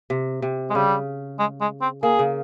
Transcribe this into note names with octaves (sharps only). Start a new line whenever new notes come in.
C3
C3
G#3
C#3 G3
G#3
G#3
C4
A#3 G#4
C#3